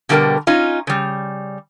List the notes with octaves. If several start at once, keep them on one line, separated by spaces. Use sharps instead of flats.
B2 D3 G3 D4 A#4 G5
C#4 D#4 F4
C#3 G3